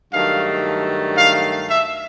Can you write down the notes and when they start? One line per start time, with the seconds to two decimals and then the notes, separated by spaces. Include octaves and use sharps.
0.13 G2 D#3 F#3 A3 F5
1.17 F5
1.69 E5